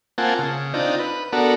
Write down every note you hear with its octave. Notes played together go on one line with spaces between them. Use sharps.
A#3 C4 F4 F#5 G#5 A5
C#3
C4 D4 D#4 F4
B4
B3 D4 F#4 A4 A#4